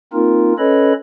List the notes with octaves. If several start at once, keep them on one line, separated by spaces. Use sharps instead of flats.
A#3 C4 D#4 F4 A#4
C#4 A4 B4 C#5 D#5 B5